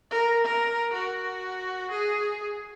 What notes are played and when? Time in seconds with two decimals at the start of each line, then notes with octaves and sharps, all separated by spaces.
0.11 A#4
0.44 A#4
0.93 F#4
1.91 G#4